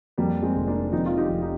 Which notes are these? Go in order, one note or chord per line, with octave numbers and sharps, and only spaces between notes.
F2 G3 A#3
G#3 C4
F1
A#3 D4
F2 C4 D#4
F4
D#4 G4
F1
D#4 G4